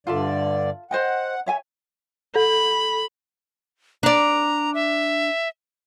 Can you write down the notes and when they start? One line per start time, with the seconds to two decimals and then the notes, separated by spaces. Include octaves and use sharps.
0.07 G2 D3 F4 A4 D5 E5
0.91 C5 D#5 F#5 G5
1.46 C#5 E5 G#5
2.35 A4 B5
4.03 D4 D5 A#5
4.74 E5